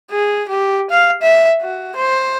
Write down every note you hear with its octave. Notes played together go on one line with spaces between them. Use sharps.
G#4
G4
F5
E5
F#4
C5